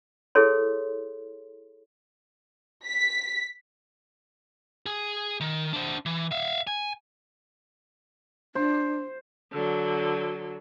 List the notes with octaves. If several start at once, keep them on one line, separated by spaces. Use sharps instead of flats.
E4 G#4 A4 C#5 C6
B6
G#4 G#5
D#3
D4 C5
E3
E5 F5
G#5
D4 C5
D3 F#3